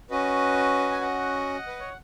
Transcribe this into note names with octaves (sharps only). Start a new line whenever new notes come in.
C#4 F#4 B4 D#5
G#5
D#5 F#5
B4
C#5